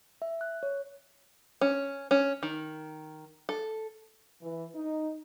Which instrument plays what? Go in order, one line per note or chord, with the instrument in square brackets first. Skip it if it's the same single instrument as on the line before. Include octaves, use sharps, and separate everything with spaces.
[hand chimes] E5
F#6
C#5
[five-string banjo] C#4
C#4
D#3
A4
[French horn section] E3
D#4